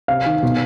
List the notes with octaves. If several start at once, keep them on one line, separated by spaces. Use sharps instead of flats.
C3 F5
D#3
B2